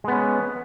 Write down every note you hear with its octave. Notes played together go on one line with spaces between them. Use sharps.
G#3 B3 C#4